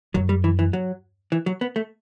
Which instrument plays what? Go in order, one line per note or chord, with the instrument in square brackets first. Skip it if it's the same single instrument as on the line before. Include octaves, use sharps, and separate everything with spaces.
[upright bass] F#2 [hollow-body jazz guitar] F#3
[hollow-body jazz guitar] G3
E3
E3
F#3
E3
F#3
B3
A3